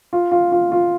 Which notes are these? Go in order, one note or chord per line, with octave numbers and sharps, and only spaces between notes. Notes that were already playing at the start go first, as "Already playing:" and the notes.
F4
F4
F4
F4